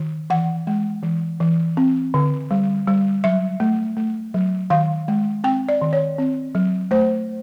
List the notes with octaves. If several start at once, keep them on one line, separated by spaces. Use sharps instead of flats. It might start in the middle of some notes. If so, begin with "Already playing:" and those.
Already playing: D#3
E3 F#5
G#3
E3
E3
C4
D3
G3
G3
F#3 E5
A3
A3
F#3
D#3 F5
G#3
C4 G5
D5
D#3
C#5
C4
F#3
A3 C5